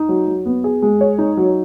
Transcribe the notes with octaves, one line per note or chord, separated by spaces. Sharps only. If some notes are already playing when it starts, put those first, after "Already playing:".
Already playing: D#4
F#3
F#3
B3
G#4
G#3
C#5
D#4
F#3